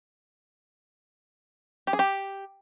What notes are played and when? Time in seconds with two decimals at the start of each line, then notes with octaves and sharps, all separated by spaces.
1.87 G4
1.93 G#4
1.99 G4